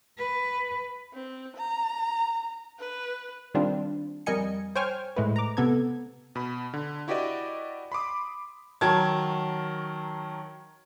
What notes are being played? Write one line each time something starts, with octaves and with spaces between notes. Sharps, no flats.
B4
C4
A#5
B4
D#3 G3 C4 D4 F4
F2 G3 A#4 D#5 G#5 C#7
C5 C#5 G5 G#5 C#6 F6
A2 G#3 A3 B4
A#5 D6
C3 B3 A4 G#6
B2 B5
D3
E4 F#4 G4 B4 D5 D#5
B5 C6 D6 D#6
D#3 F#3 A#4 C#5 A5 G#6